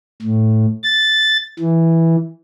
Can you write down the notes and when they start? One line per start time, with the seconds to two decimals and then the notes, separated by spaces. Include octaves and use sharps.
0.22 A2
0.83 A6
1.59 E3